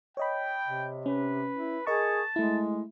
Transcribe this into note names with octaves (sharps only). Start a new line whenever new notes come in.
C#5 D#5 G5 B5
C3
C#4 B4
E4
G#4 A#4 D#5 A5 C#6
G#3 A3 E4